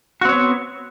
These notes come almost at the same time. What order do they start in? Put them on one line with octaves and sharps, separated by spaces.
F#4 C4 C#5 B3